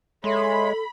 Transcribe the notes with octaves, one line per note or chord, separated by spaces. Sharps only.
G#3 A4 C#5 E5 B5 C6